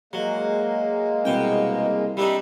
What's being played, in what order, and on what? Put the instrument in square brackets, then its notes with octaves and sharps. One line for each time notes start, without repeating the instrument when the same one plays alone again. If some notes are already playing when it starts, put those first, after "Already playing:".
[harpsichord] F#3 [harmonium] G#3 A#3
[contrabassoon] C2 [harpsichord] B2 G5
[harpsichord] G3 D4 D#4 [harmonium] E5